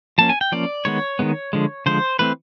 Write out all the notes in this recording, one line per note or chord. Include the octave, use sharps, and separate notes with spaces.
F3 A#3 C#4 A5
G#5
G5
F3 A#3 C#4 D5
D#3 G#3 B3 C#5
D#3 G#3 B3
D3 F3 G#3
D3 F3 G#3 C5
E3 A3 C4 B4